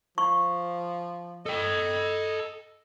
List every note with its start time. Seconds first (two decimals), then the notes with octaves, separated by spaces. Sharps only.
0.18 F3 C#6
1.46 A4 D#5 G5